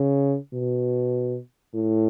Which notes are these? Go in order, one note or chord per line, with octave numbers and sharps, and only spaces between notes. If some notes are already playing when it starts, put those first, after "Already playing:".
Already playing: C#3
B2
A2